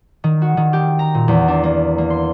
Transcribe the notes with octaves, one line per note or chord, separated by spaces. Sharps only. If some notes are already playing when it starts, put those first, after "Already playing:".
D#3
F#4
D#3
G4
A#5
A#2
E2
D4
A#3
A#3
C6